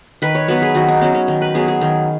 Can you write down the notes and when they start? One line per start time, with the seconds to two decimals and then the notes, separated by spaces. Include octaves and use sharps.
0.22 D#3 B4
0.35 C#5
0.48 F#3 B3 B4
0.62 G#4
0.75 D#3 F#4
0.88 D#4
1.01 F#3 B3 C#4
1.15 C#4
1.28 D#3
1.42 B4
1.55 F#3 B3 G#4
1.68 G#4
1.81 D#3